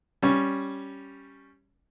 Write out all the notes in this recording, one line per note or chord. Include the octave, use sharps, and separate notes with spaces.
G3 C#4